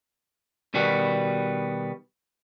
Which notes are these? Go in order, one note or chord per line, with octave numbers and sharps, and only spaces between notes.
B2 D#3 G3 B3 F#4